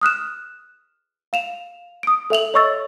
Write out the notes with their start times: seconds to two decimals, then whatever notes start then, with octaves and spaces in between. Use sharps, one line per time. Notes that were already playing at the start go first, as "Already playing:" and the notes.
0.01 D#6 F6 F#6 E7
1.33 F5 E7 F7
2.03 D#6 D7
2.30 A4 E5 F7 F#7
2.54 C#5 D#5 C#6 E6 A6